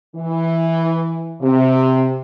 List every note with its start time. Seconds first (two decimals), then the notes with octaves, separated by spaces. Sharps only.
0.16 E3
1.41 C3